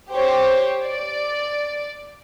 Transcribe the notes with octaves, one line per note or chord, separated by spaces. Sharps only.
G4 C5 C#5
D5